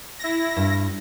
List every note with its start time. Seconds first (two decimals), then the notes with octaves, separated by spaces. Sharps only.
0.19 E4 A#6
0.57 G2